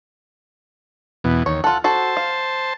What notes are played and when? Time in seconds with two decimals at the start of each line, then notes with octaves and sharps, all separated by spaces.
1.24 E2 B2
1.46 D#2 C#5
1.64 F4 A4 F#5
1.84 F#4 A4 C5 A5
2.17 F5